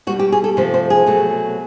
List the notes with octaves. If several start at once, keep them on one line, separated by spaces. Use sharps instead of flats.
B2 G3 F#4
G4
G#4
A4
C3 F3 A3 C5
C5
G#4
B2 F#3 A3